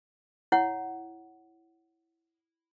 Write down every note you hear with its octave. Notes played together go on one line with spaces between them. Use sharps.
E4 C#5 F#5